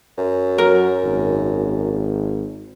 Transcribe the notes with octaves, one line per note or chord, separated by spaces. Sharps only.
F#2
F#3 A#4
G#1